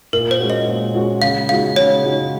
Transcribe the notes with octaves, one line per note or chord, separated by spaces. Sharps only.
A#2 A#4
C5
G#3 C#4 F#4
D#5
A#2
G#3 C#4 F#4
C#3 F5
G#3 D#4 F#4 F5
C#3 C#5
G#3 D#4 F#4